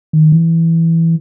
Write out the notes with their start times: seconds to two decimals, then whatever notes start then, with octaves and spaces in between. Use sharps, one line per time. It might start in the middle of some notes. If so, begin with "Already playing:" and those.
0.13 D#3
0.32 E3